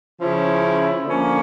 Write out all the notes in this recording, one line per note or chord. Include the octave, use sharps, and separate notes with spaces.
C#3 F3 C#4 E4
D3 F3 A#3 C#4